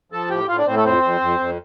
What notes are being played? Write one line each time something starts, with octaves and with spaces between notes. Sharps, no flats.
F3 A4 A5
A2 G4 G5
A2 F4 F5
D4 D5
A2 C4 C5
A3 A4
F2 C4 C5
F2
F2
F2